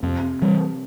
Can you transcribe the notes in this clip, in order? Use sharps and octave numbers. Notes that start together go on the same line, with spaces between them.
F2 C3
E3 G3